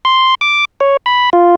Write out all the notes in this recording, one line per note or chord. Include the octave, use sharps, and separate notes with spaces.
C6
D6
C#5
B5
F4